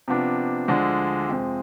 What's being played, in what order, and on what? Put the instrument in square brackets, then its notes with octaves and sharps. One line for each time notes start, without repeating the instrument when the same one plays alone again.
[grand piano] C3 F3 B3 D4
D2 D3 F3 G#3 D4
F2 C3 F3 G#3 C4